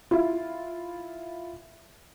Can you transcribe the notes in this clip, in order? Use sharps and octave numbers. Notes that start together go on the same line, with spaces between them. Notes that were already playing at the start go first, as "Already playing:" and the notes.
E4 F4